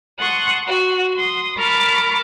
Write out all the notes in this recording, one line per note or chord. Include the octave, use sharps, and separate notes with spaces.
F#5 A5 C6 C#6 D#6 F#6
F#4
C6 D#6
A#4 A5 B5 C#6 D6 F6